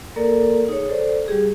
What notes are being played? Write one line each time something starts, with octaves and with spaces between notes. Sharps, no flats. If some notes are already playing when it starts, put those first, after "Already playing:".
A#3 A4 A#4 D5
D#4 G#4 C#5
A4 C5 D5
G3 G4 G#4